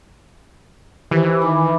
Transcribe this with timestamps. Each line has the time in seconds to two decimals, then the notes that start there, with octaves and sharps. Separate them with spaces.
1.11 D#3 E3 G4 B4 C5
1.42 D#4 B5 D6